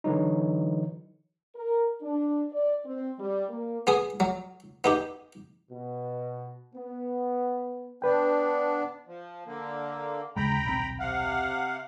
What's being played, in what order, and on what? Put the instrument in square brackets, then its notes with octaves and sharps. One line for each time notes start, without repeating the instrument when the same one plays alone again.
[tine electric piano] D3 E3 F#3 D#4
[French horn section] A#4
D4
D5
C4
G3
A#3
[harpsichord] B3 G#4 D#6
F#3
B3 D#4 G4
[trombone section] B2
B3
[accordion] B3 D4 [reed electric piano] B4 G5
[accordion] F3
D3 A#3
[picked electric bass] D#2 C#3 G#3 [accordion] G5 A#5 B5
[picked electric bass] D#1 B1 C4
[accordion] C3 F5 F#5